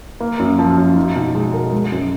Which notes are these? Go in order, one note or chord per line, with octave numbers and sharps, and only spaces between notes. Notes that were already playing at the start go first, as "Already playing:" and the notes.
A#3
F#2
F3
F#2
D#4
B2
G#3
A#4
G#3
F#2